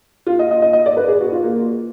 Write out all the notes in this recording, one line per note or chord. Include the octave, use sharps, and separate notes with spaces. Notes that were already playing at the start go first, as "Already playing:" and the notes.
F4
D#5
D#5
D#5
D#5
D5
B4
G#4
F#4
F4
A#3